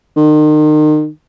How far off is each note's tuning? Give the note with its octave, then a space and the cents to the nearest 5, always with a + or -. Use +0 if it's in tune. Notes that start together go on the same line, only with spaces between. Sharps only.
D#3 -35